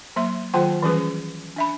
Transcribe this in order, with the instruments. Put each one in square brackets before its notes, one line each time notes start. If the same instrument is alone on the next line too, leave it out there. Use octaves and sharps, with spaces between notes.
[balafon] F#3 A#3 E5 C6
D#3 F#3 F4 C5 F#5 G5
E3 G3 C#4 G#4 B4
D4 E5 B5